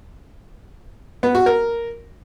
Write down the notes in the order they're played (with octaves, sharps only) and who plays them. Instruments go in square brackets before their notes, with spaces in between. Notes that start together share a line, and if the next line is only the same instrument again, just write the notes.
[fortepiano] B3
F#4
A#4